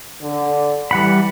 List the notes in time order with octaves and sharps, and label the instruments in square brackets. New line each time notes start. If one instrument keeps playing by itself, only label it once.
[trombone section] D3
[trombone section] E3 [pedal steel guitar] G3 F#5 B5